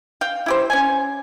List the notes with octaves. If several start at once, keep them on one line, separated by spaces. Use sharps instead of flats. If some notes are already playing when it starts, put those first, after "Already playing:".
F5 G5
E4 G4 C5
C#4 G#5